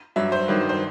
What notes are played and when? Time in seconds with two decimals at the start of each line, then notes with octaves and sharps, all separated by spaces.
0.16 G2 F#3 E5
0.32 C5
0.48 G2 D#3 F#3
0.69 C5